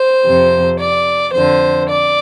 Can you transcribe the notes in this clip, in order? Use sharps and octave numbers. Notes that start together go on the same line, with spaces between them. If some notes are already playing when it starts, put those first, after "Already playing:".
Already playing: C5
F2 C3
D5
F2 D3 C5
D5